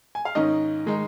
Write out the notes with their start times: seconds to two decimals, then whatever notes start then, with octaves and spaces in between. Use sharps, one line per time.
0.15 G#5
0.25 F5
0.35 G#2 D#3 C#4 D#4 D#5
0.86 D#3 G#3 D#4